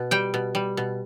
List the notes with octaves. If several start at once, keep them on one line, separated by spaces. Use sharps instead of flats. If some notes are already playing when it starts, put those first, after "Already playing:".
Already playing: B2
G3 G5
B2
G3
B2